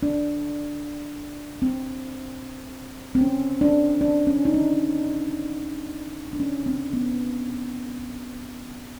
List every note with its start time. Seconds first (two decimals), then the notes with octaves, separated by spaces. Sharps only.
0.03 D4
1.62 C4
3.15 C4
3.21 C#4
3.61 D4
4.01 D4
4.27 C#4
4.45 D#4
4.54 D4
6.33 D4
6.40 C#4
6.66 C4
6.93 B3